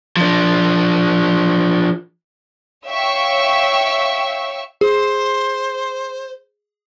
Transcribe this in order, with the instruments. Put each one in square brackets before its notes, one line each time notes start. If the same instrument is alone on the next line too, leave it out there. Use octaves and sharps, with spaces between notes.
[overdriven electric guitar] F3 D4
[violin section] C#5 E5 F5 G5 C#6 E6
[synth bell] G#4 [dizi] C5